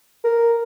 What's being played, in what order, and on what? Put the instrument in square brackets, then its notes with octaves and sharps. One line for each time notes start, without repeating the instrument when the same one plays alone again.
[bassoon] A#4